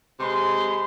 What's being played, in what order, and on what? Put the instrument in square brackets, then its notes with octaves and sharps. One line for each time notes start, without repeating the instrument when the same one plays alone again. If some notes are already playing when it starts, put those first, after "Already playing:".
[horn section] C3 G#3 B4 C6